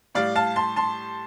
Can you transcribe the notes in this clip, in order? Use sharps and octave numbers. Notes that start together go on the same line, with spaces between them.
A2 G3 D5 F5
F5 A5
A5 C6
A5 C6